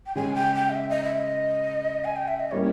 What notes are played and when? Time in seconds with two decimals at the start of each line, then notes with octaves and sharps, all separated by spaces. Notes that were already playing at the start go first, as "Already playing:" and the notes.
0.06 G5
0.15 C#3 G#3 C#4 G#5
0.35 G5
0.55 G5
0.70 D#5
0.74 E5
0.89 D#5
1.04 E5
1.19 D#5
2.04 G#5
2.16 G5
2.28 E5
2.40 D#5
2.51 G3 A#3 C#4 E4 C#5